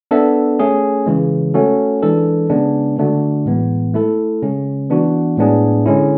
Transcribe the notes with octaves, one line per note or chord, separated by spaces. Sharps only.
B3 D4 A4 E5
A3 C#4 G#4
C#3 E3 G#3
A3 C#4 F#4 A4
E3 G#3 D4 A4
C#3 G#3 B3 D4
D3 A3 D4 F#4
A2 E3 G#3 B3
A3 E4 A4
C#3 G#3 C#4
E3 B3 D4 F#4
A2 G#3 B3 D4 G#4
D3 G#3 C#4 E4